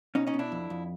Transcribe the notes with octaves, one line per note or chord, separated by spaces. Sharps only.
B2 C#4 D#4
C#4 D#4
B2
D4 E4
F2
F2